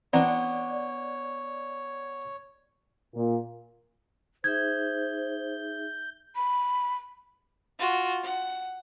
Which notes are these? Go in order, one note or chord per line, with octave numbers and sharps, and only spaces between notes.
E3 B3 C4 D4 C#5 D5 A#5
A#2
D#4 G#4 C5 E5 G6 G#6
B5
F4 F#4
F#5